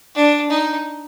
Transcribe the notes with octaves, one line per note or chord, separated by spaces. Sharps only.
D4
D#4